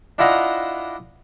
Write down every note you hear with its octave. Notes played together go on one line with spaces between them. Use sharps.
D4 E4 F4 D#5 F#5 A#5